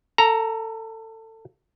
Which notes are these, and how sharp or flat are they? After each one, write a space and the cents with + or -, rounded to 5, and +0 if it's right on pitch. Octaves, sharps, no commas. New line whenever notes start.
A4 +25 A#5 +0